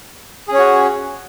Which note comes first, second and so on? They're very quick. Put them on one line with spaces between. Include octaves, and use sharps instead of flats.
G#4 C#4 C#5 F#4